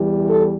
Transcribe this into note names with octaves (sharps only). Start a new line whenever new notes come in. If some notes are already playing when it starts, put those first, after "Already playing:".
Already playing: E2 E3 G3
A4